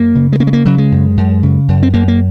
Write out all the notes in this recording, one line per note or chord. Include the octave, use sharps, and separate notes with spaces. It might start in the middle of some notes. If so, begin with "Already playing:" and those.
Already playing: F#2 A#3
C#3
G#3
C#3 A#3
G#3
A#3
C#3 F#3
G#3
F#2
F#2
C#3
F#2
C4
F#2 A#3
A#3